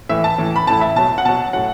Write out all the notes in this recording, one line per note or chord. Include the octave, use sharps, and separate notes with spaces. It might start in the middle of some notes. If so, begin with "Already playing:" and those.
A2 E3 E5
A5
A2 E3
B5
A2 E3 A5
E5
B2 F#3 A5
F#5
B2 F#3 A5
A2 F#3 F#5